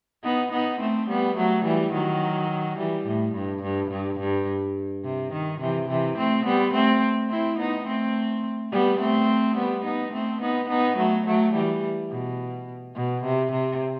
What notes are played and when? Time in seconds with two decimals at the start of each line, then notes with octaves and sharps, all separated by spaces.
0.24 B3 D#4
0.52 B3 D#4
0.81 A3 C4
1.09 G3 B3
1.37 F#3 A3
1.65 E3 G3
1.93 D#3 F#3
2.78 E3 G3
3.06 A2
3.35 G2
3.63 G2
3.91 G2
4.20 G2
5.04 C3
5.33 D#3
5.61 C3 E3
5.89 C3 E3
6.17 A3 C4
6.45 G3 B3
6.74 A3 C4
7.30 C4 E4
7.58 B3 D#4
7.87 A3 C4
8.72 G3 B3
9.00 A3 C4
9.56 G3 B3
9.85 B3 D#4
10.13 A3 C4
10.41 B3 D#4
10.69 B3 D#4
10.98 F#3 A3
11.26 F#3 A3
11.54 E3 G3
12.11 B2
12.95 B2
13.24 C3
13.52 C3